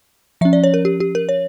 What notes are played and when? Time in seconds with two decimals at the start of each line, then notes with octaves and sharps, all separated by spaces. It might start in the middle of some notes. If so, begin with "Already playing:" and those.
0.41 F3 E5
0.45 C#4
0.53 D5
0.64 C#5
0.74 A#4
0.85 G4
1.00 G4
1.15 A#4
1.29 C#5